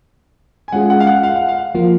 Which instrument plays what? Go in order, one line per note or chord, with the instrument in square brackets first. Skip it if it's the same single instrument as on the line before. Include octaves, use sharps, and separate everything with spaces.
[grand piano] G#5
[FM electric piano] G#3 C#4 F4 G#4 [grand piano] F#5
[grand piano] F#5
F5
F#5
F5
F#5
F5
[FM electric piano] F3 A#3 F4